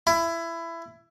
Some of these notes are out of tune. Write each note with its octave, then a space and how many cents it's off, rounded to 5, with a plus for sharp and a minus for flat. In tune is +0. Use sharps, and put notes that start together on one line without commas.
E4 +20